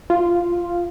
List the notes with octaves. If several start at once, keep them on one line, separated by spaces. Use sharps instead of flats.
F4